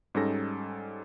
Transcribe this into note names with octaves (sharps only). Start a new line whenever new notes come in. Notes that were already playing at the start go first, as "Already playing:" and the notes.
G#2 G3 C#4 D#4 A4 A#6